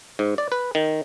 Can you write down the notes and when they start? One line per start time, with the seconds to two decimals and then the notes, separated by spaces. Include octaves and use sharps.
0.19 G#2
0.38 D5
0.52 B4
0.75 D#3